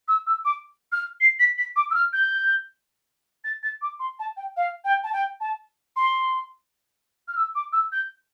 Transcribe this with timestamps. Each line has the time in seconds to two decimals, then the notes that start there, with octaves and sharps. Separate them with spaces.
0.08 E6
0.26 E6
0.45 D6
0.92 F6
1.20 C7
1.39 B6
1.58 B6
1.76 D6
1.90 E6
1.94 F6
2.13 G6
3.44 A6
3.63 A6
3.81 D6
3.99 C6
4.19 A5
4.37 G5
4.56 F5
4.84 G5
5.03 A5
5.12 G5
5.40 A5
5.96 C6
7.28 F6
7.36 E6
7.55 D6
7.72 E6
7.92 G6